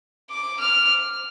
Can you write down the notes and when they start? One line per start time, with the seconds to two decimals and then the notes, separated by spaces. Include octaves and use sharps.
0.30 D6
0.60 F6